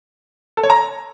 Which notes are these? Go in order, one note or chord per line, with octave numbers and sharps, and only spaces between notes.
A4
C#5
A#5